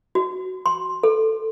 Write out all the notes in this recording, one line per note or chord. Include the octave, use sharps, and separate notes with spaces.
F#4
C6
A4